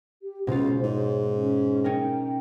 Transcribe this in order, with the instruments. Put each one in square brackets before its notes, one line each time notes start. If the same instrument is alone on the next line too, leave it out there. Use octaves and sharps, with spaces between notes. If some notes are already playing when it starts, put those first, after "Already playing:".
[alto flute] G4
[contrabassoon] C#2 [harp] B2 F4 [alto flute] C5
[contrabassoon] G#2 [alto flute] C#5
[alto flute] C#4
[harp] C#4 D#4 A#4 [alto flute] G5